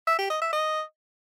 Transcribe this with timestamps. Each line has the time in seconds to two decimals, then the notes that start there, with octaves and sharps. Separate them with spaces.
0.07 E5
0.18 G4
0.30 D#5
0.41 E5
0.53 D#5